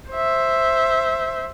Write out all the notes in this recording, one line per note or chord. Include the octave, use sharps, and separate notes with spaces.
C5 E5